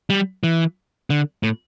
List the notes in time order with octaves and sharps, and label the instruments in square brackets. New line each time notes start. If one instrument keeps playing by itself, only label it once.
[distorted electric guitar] G3
E3
D3
A2